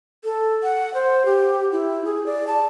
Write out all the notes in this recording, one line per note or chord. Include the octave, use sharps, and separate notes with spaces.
A4
F#5
C5
G4
E4
G#4
D5
A5